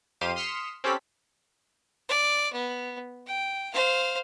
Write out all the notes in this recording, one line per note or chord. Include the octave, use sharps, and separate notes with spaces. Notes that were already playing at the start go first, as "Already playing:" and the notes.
F2 G4 C5 F5 D#7
C6 D#6 F6 B6 C#7 E7
C4 C#4 G4 A4 B5 B6
D5
B3
G5
C5 F5